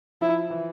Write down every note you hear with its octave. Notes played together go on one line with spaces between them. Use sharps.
F3 E4
E3